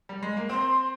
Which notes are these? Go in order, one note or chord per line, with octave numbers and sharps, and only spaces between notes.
G3
G#3
A#3
C4 C6